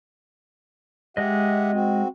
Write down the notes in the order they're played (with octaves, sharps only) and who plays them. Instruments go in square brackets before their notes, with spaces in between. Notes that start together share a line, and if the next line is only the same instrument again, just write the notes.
[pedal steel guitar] G#3 D#5 [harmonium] G4 E5 F#5
[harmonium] C4 F#4